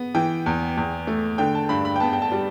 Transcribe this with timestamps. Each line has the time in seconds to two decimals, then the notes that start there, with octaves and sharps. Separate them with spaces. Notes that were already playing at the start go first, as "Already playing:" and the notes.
Already playing: B3
0.15 E3 G5
0.46 E2
0.77 E2
1.07 A3
1.38 D3 G5
1.55 A5
1.69 G2 B5
1.85 B5
1.96 G5
2.00 B3 A5
2.13 G5
2.22 A5
2.32 G3